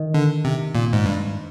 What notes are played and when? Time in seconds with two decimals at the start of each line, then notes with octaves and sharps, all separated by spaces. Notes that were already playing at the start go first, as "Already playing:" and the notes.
Already playing: D#3
0.14 D3
0.45 C3
0.75 A#2
0.93 G#2
1.05 G2